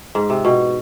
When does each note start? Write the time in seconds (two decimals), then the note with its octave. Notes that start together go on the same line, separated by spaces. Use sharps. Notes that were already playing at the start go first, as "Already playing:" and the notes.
0.15 G#2
0.30 C3
0.45 B2